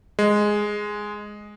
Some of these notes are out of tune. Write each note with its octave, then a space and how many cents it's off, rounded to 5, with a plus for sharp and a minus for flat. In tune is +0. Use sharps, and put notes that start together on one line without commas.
G#3 +0